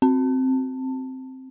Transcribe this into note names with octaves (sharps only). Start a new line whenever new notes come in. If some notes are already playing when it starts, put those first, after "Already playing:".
C4